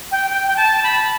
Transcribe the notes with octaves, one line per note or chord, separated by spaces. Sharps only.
G5
G5
G5
A5
B5